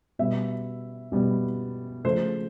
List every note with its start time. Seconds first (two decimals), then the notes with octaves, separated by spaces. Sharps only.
0.19 B2 G3 B3 E5
1.12 B2 G3 B3
2.04 C#3 F3 A3 C5